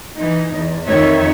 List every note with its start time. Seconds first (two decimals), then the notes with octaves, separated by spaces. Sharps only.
0.18 E3 D#4
0.55 E2
0.86 F2 D#3 D#4 C#5 E5